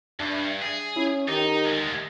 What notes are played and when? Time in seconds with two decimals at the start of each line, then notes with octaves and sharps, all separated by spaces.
0.20 G2 D4 E5
0.62 G#4
0.96 C#4 E4
1.28 D#3 D#4 G4
1.65 D2 G#3